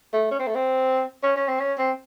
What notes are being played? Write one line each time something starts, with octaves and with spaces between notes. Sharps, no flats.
A3
C#4
C4
A3
C4
C#4
C#4
C4
C#4
C4